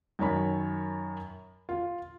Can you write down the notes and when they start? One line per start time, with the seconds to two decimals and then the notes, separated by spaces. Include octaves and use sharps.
0.19 F#2 D#3 C#5 B5
1.69 F4